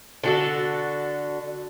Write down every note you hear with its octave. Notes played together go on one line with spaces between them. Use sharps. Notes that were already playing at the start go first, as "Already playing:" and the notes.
D3 F#4 A4